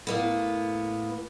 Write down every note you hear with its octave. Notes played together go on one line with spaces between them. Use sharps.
A2 A#3 B3